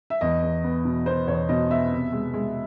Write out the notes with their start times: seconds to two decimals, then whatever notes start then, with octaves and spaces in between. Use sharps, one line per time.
0.10 E5
0.21 E2 D#5
0.42 E2
0.64 B3
0.85 B2
1.06 B3 C5
1.27 E2 C#5
1.49 B2 D#5
1.70 B3 E5
1.92 C3
2.12 G#3
2.34 G#3